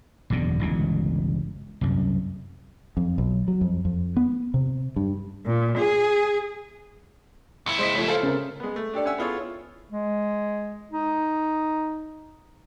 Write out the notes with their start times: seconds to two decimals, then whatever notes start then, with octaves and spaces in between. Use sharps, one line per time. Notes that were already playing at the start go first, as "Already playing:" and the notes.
0.30 F#1 E2 B2 D3
0.60 G1 C#2 B2 E3
1.81 C2 F#2
2.97 F2
3.18 B1
3.48 F#3
3.61 F2
3.85 F2
4.17 B3
4.54 C3
4.96 G2
5.46 A#2
5.77 G#4
7.66 C#2 E4 C#7
7.79 G#3 C5 D#5 B6
7.95 F3 A3 C#5
8.08 A4 C5 F5
8.23 C#3 C4 A#4
8.60 G#3 B3
8.76 A3
8.94 D4 G4 A4 D5
9.05 C#4 C#5 E5 F#5 G#5 E6
9.18 B3 E4 F4 G#4 A4 C#5
9.91 G#3
10.92 D#4